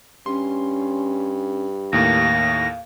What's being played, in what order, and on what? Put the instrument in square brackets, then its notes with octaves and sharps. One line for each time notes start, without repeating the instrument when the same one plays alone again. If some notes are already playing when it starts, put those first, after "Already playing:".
[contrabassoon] G2 [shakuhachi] C#4 [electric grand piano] C6
[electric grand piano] D#2 A2 A#3 [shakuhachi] F5 [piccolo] A#6